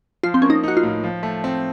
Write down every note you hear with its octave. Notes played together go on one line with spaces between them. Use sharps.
F3 F4
C4
A#3 C#4
D#4
D#4 F#4
F4
A2
F3
A3
C4